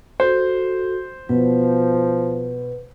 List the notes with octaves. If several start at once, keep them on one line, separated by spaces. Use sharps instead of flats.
F#4 A4 C5
B2 F3 B4